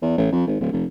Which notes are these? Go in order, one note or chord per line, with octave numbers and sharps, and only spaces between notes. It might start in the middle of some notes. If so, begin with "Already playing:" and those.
E2
A1
F2
G#1
D1
F1